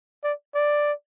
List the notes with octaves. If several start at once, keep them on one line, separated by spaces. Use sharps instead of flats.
D5
D5